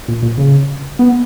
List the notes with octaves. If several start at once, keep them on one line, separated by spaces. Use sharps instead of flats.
A#2
A#2
C#3
B3